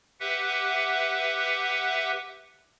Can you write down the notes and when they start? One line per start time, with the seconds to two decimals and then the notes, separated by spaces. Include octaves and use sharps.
0.20 G4 B4 E5 F#5